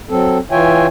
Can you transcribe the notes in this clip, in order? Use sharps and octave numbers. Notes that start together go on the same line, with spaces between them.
F#3 C4 A4
E3 F4 C#5 E5 G5 G#5